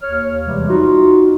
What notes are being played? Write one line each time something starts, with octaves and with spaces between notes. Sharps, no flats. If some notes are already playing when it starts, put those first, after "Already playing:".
D#2 C#5 F6
E2 C3 E3 G3 G#3
D#4 F4 F#4